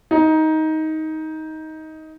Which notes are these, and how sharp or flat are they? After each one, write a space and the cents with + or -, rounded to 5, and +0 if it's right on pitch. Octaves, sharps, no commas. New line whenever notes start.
D#4 +15